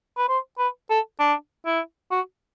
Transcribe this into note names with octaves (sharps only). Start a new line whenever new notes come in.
B4
C5
B4
A4
D4
E4
F#4